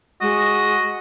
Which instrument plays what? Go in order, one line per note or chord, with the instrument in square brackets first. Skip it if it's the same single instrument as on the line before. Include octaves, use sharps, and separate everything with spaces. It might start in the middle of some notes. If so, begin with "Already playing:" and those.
[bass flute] G#3 [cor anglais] F#4 [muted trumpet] D#5